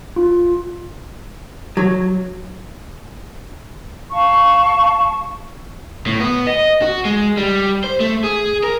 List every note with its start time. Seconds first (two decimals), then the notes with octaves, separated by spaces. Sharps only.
0.16 F4
1.77 F#3
4.11 F5 A5 C#6
6.07 A2
6.20 B3
6.47 D#5
6.82 F#4
7.05 G#3
7.37 G3
7.84 C5
8.00 A3
8.24 G#4
8.63 A#4